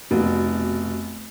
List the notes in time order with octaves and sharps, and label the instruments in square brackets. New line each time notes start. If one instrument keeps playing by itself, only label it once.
[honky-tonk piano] F1 B2